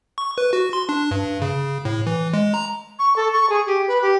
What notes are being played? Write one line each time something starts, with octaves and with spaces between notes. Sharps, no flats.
C#6
B4
F#4
C6
D4
G2
C#3
A2
E3
G#3
A#5
C#6
A4
C#6
G#4
G4
B4
G4